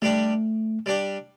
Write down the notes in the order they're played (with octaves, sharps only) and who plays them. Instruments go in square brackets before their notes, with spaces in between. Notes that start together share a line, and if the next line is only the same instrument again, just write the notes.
[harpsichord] G3 D4 G4 [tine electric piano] A3
[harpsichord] G3 D4 G4